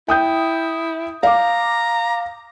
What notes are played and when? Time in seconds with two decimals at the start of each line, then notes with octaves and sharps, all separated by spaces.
0.08 E4 G5 D#6 G6
1.23 F5 A#5 D6